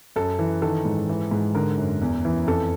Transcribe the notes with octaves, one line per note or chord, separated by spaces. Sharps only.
F#2 A4
E3
D#3 A4
G#2
E3
G#2
D3 A#4
F#2
E2
E3
F2 A4